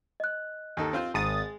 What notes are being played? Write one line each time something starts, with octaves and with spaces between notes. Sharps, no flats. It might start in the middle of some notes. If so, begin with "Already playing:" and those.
D#5 F#6
D#2 D#4 A4
C4 F4 C5
G#1 G#3 D#6 A6